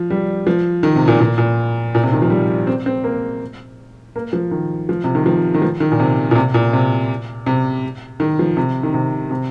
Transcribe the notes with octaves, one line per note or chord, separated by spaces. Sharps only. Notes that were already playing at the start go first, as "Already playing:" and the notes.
Already playing: F3
G3
F3
D#3
C3
A#2
A#2
A#2
A#2
C3
D#3
F3
G3
C4
C4
A#3
A#3
F3
D#3
F3
C3
D#3
F3
D#3
F3
D#3
A#2
C3
A#2
C3
A#2
C3
C3
D#3
F3
C3
D#3
C3
C3